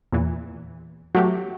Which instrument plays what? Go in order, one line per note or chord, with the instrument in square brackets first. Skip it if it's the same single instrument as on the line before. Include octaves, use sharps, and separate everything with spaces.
[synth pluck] E2 A#2 E3
[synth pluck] F#3 A3 G4 [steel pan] F#4